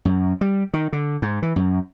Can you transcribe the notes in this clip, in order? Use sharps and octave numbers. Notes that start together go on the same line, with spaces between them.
F#2
G3
D#3
D3
G#2
E3
F#2